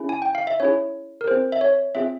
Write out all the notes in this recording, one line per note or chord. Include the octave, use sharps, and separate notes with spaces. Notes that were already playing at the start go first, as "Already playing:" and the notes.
Already playing: C#4 E4 G#4
G#5
G5
F5
E5
C#4 E4 G#4 C#5
A#4
C4 F4 G#4 C5
E5
C#5
C4 F4 G#4 E5